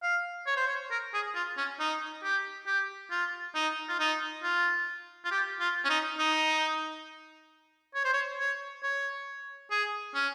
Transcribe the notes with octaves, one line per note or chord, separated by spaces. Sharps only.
F5
C#5
C5
C#5
A#4
G#4
F4
C#4
D#4
G4
G4
F4
D#4
F4
D#4
F4
F4
G4
F4
C#4
D#4
D#4
C#5
C5
C#5
C#5
C#5
G#4
C#4